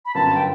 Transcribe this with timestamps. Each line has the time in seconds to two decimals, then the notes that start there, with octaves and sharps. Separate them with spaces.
0.05 B5
0.15 G1 F#2 F#3 A5
0.35 G5